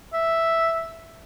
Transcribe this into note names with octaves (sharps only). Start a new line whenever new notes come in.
E5